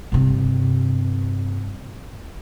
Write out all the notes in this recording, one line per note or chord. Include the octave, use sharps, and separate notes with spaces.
G2 C3